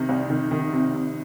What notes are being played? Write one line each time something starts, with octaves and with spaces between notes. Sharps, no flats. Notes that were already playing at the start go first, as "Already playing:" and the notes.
Already playing: C3 D#3
C2
D#3
D#3
C3
C3